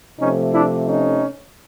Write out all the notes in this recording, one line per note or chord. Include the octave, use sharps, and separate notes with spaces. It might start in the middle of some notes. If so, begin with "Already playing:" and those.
C3 F3 A3 C#4 D#4
D4 E4
C#4 D#4